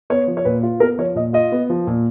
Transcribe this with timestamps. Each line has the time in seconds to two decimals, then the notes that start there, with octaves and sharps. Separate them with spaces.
0.10 B3 C#5
0.28 F3
0.37 C#5
0.45 A#2 B4
0.63 F4
0.80 B3 A#4
0.99 F3 C#5
1.15 A#2 D#5
1.33 F4 D#5
1.52 B3
1.70 F3
1.87 A#2